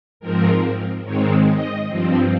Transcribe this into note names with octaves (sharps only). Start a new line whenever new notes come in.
G#2 F3 C4 A#4
G#2 D#3 G#3 C4 C#5
D#5
G2 F3 C4